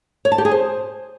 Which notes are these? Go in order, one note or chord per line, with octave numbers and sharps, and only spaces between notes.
C#5
A5
G4
G#4
C5